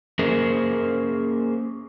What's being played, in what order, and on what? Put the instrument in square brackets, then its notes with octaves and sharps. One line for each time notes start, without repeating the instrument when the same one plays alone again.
[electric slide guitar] A#3 C#4 G#4 A#4 C5